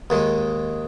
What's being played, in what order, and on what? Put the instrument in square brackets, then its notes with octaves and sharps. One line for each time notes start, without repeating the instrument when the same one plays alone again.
[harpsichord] D#2 D#3 G#3